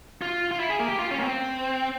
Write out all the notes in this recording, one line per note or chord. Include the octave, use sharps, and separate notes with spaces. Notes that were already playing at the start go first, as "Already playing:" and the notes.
F4
F4
E4
G#4
A#3
G4
F4
C#4
A#3
C4